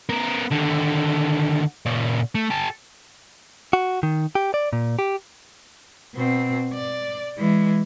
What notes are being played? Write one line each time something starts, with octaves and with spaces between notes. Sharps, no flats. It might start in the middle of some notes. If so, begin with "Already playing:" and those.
B3 A#4
D#2 D3
A#2 C#3
A3
G4 A4
F#4
D#3
G4
D5
A#2
G4
B2 C4
D5
E3 G#3